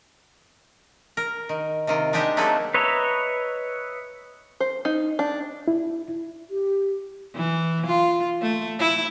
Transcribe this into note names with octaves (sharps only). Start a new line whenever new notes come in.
A#4
D#3
C3 D#3 F4
G#3 D4 D#4 G4 D#5 E5
F#3 A3 A#3 C4 G#4 A4
B4 C#5 D#5 E5 A#5
C5
D#4
D4
E4
G4
E3
F4
A3
E4